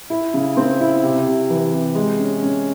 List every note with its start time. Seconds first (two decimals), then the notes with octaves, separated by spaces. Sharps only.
0.10 E4
0.34 C#3
0.57 C4
0.80 E4
1.03 C3
1.27 C3
1.50 E3
1.72 C3
1.95 G#3
2.19 C#4
2.43 C#4